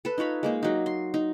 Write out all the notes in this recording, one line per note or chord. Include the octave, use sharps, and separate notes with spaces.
A4 B4
D#4 F4 C#5 B5
G#3 A#3 D#4
F#3 D#4
C6
D#4